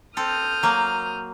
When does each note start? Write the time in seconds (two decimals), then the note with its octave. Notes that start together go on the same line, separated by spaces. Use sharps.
0.17 C4 A4 D#6 F6 G6
0.63 F#3 A#3